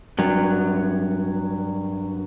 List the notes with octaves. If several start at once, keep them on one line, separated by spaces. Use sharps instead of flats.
G2 F#3